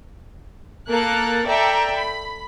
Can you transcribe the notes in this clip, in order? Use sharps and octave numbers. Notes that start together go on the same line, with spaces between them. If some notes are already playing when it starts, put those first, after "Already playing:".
A#3 A4 A#4 F#6 A6
A4 D5 E5 G5 A#5
B5